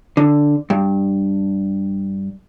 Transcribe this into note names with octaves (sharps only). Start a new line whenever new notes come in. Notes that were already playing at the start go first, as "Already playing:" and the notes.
D3
G2